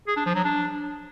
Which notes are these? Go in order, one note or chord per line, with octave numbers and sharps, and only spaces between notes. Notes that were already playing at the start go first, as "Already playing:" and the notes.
G#4
D4
F3
F#3
D4